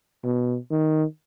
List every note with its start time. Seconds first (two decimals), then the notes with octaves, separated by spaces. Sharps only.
0.24 B2
0.71 D#3